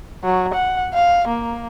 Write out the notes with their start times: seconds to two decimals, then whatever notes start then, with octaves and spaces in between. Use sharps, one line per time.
0.24 F#3
0.54 F#5
0.94 F5
1.27 A#3